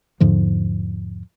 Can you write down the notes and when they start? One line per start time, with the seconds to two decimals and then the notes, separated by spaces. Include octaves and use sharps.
0.20 E2 G#2 D3 F3